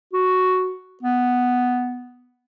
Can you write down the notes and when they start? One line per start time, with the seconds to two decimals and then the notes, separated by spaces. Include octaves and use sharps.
0.13 F#4
1.03 B3